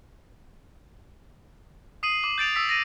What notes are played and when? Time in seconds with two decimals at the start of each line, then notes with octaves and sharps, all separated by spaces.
2.03 D#6 C7 D#7 F#7
2.23 D6 F#7
2.38 G6 A6 D7 F7
2.55 D#6 E6 B6
2.69 A#6 D#7